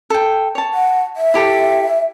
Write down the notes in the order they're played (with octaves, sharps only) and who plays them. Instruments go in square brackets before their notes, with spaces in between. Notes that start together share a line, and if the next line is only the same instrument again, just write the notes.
[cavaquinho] A4 G5
C#5 A5
[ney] F#5
E5
[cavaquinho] E4 G4 A4